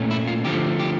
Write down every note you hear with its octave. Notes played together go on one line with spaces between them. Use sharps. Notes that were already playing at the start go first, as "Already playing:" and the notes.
Already playing: A#2 A3 C#4
E4
F4
D3 F3 A3 G4
G4